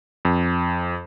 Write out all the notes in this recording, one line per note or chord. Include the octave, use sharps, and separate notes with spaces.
F2